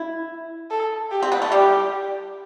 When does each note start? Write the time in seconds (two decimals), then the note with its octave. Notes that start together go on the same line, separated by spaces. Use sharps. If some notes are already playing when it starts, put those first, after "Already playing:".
Already playing: E4
0.70 A4
1.11 G4
1.23 C4
1.32 B3
1.42 A3
1.52 G3 G4